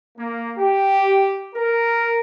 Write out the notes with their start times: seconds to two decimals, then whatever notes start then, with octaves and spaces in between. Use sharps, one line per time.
0.18 A#3
0.58 G4
1.54 A#4